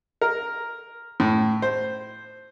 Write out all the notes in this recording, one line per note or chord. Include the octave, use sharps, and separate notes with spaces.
A#4
A2
C5